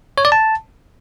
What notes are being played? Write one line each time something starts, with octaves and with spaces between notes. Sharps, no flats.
C#5
D5
A5